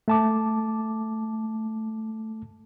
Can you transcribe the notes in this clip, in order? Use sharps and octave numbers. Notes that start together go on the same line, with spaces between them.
A3 A5 D6